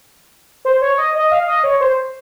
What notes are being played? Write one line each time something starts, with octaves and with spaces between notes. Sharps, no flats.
C5
C#5
D#5
D#5
F5
D#5
C#5
C5